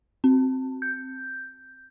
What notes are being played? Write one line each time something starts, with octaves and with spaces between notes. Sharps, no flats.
C4
G6